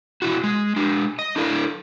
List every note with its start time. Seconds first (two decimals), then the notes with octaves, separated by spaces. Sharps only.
0.22 B2 E4 F#4
0.44 G#3
0.76 G#3 D4
1.19 D#5
1.36 D4 E4 A4 D5 F5